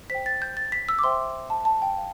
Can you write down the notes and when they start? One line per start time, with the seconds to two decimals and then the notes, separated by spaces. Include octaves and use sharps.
0.10 C5 G5 B6
0.26 A6
0.42 G6
0.57 A6
0.72 B6
0.89 E6
0.99 D6
1.03 C5 E5 G5 C6
1.50 A5
1.65 A5
1.82 G5
1.97 F5